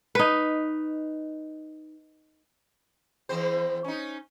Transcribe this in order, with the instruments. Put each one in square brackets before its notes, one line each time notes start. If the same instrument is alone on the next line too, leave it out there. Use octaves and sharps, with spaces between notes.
[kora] D#4 B4
[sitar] E2 C4 C5
C#4 D#4